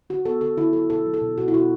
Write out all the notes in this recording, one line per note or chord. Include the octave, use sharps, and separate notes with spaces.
D3 F#4
B3 A4
D3 A4
D3 E4
F#3 A4
B2 A4
F#3
A4
B2
B2 F#4
E4
B2 F#4